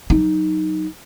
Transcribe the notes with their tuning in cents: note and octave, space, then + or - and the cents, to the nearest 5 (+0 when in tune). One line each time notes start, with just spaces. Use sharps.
F#3 +0 D#4 +0